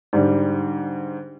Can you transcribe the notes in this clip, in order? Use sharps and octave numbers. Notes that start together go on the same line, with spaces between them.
G#2 D3 G3